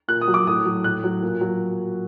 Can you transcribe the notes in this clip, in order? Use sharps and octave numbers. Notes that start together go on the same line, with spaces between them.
A#2 F#6
D#6
F#3
D6
A2 D#6
F#3
A2 F#6
F#3
A#2
F#3